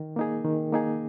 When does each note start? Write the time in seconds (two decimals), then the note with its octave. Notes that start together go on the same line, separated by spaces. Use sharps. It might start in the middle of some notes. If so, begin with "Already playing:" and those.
Already playing: D#3
0.16 A#3 D#4 G#4
0.45 D#3
0.73 A#3 D#4 G#4